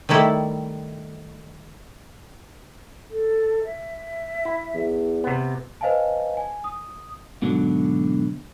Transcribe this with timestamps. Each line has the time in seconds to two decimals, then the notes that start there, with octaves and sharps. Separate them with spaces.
0.09 D#3 G3 A3 E4 A4
3.10 A4
3.64 E5
4.45 E4
4.75 E2
5.24 C3 B3
5.81 B4 C5 D#5 F5 G#5 A5
6.37 G#5
6.64 D#6
7.42 G#2 B2 D3 F#3